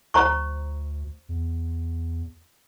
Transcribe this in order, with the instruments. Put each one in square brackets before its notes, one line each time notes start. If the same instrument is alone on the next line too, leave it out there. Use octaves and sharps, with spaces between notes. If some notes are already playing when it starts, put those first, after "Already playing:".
[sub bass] D2 [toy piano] C5 A#5 C#6
[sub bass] E2